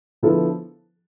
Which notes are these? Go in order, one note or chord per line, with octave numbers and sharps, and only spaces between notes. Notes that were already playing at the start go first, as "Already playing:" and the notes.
D3 F3 B3 E4 A4